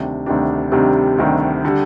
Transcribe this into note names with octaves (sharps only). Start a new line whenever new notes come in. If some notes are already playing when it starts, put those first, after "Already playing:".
Already playing: D2 C3 D#3 G3 D4
D2 C3 D#3 G3 D4
D2 C3 D#3 G3 D4
D2 C3 D#3 G3 D4
D3 G3